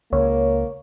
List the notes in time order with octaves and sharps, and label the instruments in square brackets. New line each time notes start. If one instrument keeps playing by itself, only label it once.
[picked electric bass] C#2 [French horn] A#3 [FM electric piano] C#5